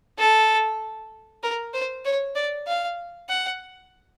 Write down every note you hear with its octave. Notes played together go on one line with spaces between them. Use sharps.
A4
A#4
C5
C#5
D5
F5
F#5